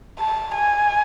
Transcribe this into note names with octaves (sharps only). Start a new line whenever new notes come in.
A5
G#5